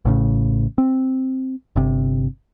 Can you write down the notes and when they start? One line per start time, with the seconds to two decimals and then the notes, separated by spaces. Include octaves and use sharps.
0.05 A1 A2 C#3
0.78 C4
1.76 G1 C3